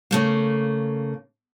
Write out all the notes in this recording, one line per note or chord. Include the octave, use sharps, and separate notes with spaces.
C#3 A3 A#3